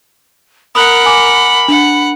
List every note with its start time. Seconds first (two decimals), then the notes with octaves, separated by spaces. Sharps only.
0.75 A#4 F#5 B5 D#6 F#6
1.06 G#5 D6
1.68 D4 F#5